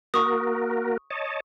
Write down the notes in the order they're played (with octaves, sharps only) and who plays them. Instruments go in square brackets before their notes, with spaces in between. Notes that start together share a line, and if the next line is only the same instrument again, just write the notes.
[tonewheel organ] A#3 F#4 A#4 [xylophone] C#6 D#6
[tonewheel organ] C#5 D#5 A5